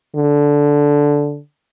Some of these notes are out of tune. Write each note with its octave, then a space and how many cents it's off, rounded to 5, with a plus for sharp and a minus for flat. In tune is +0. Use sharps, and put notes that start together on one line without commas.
D3 -10